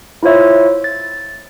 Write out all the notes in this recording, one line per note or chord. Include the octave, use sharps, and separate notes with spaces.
E4 F4 C5 C#5 E5
A6